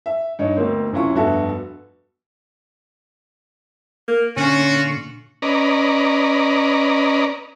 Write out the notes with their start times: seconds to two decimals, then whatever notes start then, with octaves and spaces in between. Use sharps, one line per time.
0.06 E5
0.39 G2 D#4 C#5
0.57 D2 B2 A#3 C4
0.92 F#1 C3 C#4 E4 F4 C#6
1.15 F1 G2 B3 F#4 A4 E5
4.08 A#3
4.36 A#2 D3 C#4 F4 F#4 C#6
5.42 C#4 B4 D5 D#5 A#5